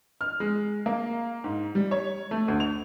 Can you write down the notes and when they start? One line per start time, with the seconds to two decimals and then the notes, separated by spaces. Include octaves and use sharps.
0.21 F6
0.40 G#3
0.86 A#3
1.44 G#2
1.75 G3
1.91 C#5
2.31 A3
2.48 D2
2.60 F7